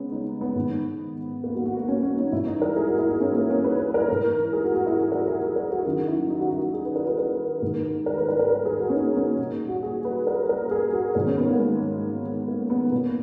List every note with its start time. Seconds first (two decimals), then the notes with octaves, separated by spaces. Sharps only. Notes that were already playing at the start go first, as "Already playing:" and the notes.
Already playing: C#3 G#3 B3 C#4
0.11 D#4
0.41 B3
0.55 G#2 D#3
1.44 A#3
1.55 F#4
1.66 F#4
1.77 A#3
1.88 C#4
2.03 C#4
2.17 D#4
2.32 G#2 E3 E4
2.47 D#4
2.62 A#4
2.76 G#4
2.87 F#4
2.98 E4
3.09 D#4
3.20 C#4
3.35 A#3
3.50 C#4
3.64 B4
3.79 B4
3.94 A#4
4.08 G#2 E3
4.53 G#4
4.64 F#4
4.75 F#4
4.86 E4
4.97 G#4
5.12 A#4
5.27 G#4
5.41 G#4
5.56 A#4
5.71 F#4
5.85 F#2 D#3 F#4
6.07 E4
6.29 D#4
6.40 F#4
6.51 F#4
6.62 F#4
6.74 G#4
6.85 B4
6.96 A#4
7.07 B4
7.18 A#4
7.62 G#2 D#3
8.06 A#4
8.17 B4
8.29 A#4
8.39 A#4
8.50 A#4
8.65 G#4
8.80 F#4
8.89 C#4
8.94 D#4
9.16 C#4
9.38 A#2
9.68 F#4
9.83 G#4
10.05 B4
10.27 A#4
10.49 A#4
10.71 G#4
10.93 F#4
11.15 G#2 D#3 A#4
11.26 C#4
11.37 B3
11.48 A#3
11.59 G#3
12.48 A#3
12.70 B3
12.92 A#2 B3